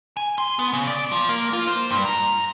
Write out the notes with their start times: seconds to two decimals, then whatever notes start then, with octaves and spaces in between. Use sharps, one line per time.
0.17 G#5
0.38 C6
0.59 B3
0.73 C#3
0.87 D5
1.12 F3
1.29 A#3
1.53 F4
1.68 C5
1.90 G2
2.05 A#5